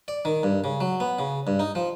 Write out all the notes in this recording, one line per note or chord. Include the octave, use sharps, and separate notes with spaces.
D5
D#3
G2
C#3
F#3
B3
C#3
G2
D#4
F3